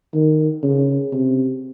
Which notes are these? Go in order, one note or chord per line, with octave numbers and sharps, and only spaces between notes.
D#3
C#3
C3